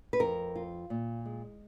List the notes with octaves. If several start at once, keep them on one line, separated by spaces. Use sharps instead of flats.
B4
F2 A#4
F4
A#2
G#3